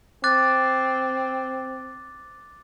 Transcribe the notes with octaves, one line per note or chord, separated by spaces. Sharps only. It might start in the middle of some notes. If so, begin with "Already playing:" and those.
C4 D6 F#6 A6